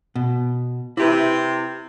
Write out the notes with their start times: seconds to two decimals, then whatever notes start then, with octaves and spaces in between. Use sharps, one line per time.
0.16 B2
0.97 C3 E4 G4 B4